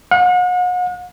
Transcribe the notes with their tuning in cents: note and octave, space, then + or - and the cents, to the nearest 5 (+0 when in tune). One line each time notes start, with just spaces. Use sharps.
F#5 -40